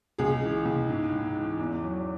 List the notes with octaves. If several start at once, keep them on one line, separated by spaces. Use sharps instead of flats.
C#2 G#4
E3
C#2
G#2
G#2
E3
E2
F#3